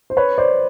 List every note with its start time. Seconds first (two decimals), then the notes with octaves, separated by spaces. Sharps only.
0.10 C5
0.17 B4 C#5
0.38 C5 D5